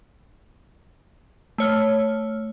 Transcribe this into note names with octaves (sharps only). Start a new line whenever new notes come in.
A3 C#5 F6